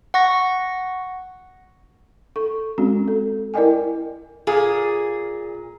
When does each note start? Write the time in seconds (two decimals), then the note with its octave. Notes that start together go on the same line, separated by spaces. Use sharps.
0.14 F#5 C#6 A#6
2.36 A4 C#6
2.78 G#3 C4 C#4 F#4
3.08 A4
3.54 E4 A#4 D5 D#5 G5 G#5
4.47 A#2 G#4